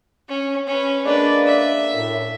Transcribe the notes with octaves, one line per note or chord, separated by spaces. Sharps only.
C#4
C#4 B4
G#3 A#3 D4 B4 D5
E5
F#2 A2